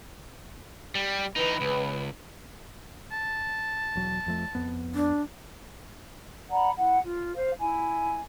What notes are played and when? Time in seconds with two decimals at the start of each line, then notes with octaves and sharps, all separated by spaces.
0.95 G3
1.36 E3 D#4 B4 B5
1.61 C#2
3.12 A5
3.96 E1 F#3
4.26 F2 F3 A3
4.55 F2 B3
4.95 D4
6.50 D5 F#5 A#5 B5
6.76 E4 F#5
7.02 F4
7.35 C5 F5
7.59 E4 G#5